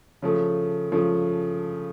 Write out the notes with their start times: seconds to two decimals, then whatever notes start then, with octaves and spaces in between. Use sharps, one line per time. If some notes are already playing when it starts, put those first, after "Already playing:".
0.22 C#3 F3 A3
0.92 C#3 F3 A3